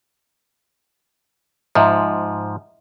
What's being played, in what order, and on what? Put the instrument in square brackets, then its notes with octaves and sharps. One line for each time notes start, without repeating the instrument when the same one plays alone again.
[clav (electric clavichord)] G#2 F3 [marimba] D#5 E5 A#5